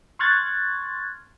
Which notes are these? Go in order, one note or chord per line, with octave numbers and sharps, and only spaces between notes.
C6 C#6 F6 F#6 G#6 A6